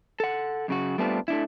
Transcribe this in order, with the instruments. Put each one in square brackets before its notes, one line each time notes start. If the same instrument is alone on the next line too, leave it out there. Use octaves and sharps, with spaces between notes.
[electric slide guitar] A4 F#5
F#2 C#3 F#4
G3 A3 B3 C4 D4 F4
A3 D4 E4